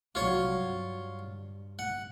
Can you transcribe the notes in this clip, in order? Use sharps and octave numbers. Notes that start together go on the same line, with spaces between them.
C2 F#3 F4 C#5
G2
F#5